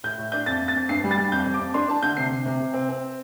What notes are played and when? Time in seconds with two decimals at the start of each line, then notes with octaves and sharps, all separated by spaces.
0.04 A2 G6
0.18 A2
0.32 D4 G6
0.46 F2 A6
0.61 F2
0.68 A6
0.76 F2
0.89 G2 C7
1.04 G3
1.11 A6
1.18 G3
1.32 F2 G6
1.46 F2
1.54 D6
1.60 F2
1.74 D4 C6
1.88 D4 A5
2.02 D3 G6
2.17 C3 C7
2.31 C3
2.46 C3
2.60 C3
2.74 C4
2.89 C4